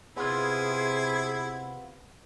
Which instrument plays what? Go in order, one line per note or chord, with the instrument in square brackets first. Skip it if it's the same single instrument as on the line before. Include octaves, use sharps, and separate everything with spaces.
[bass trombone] C3 [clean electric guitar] B3 F4 [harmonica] E4 [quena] G#4